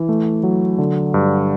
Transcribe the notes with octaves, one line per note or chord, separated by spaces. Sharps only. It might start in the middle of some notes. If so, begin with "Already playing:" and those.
Already playing: E3
A3
F#3
D3
G2